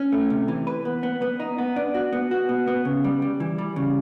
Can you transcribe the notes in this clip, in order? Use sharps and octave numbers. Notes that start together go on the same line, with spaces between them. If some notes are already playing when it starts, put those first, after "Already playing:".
Already playing: C#4
A3
C3
E3
B4
B3
B3
B3
D#4
B3
D4
F#4
B3
F#4
B3
B3
C#3
G3
G3
E3
G3
C#3